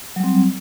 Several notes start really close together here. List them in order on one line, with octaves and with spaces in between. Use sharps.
F#3 G3 C4